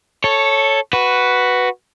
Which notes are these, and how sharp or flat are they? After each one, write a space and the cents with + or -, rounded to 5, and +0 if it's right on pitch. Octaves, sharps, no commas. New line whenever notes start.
A4 +0 C#5 +0
F#4 +0 B4 +0